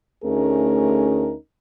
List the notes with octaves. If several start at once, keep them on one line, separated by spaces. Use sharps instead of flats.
D2 A3 C#4 D#4 G#4 A#4